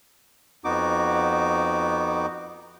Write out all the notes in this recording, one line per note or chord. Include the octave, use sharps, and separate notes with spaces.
F2 B3 D#4 F#4 D6